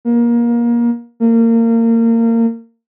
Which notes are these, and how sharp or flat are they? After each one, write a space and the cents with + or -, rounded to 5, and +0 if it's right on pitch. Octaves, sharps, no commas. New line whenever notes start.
A#3 +25
A#3 -25